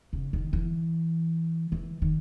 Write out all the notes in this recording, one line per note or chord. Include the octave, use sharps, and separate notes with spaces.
C#3
D#3
E3
E3
D#3